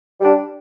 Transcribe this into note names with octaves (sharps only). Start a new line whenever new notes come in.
G3 D4